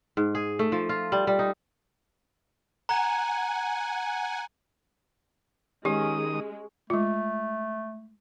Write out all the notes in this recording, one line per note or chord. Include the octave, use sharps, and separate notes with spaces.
G#2
G#4
A3
F3
F4
G3
G3
D#4
F#5 G#5 A#5
D#3 G#3 C#4 G4 D#6
G#3 A3 F4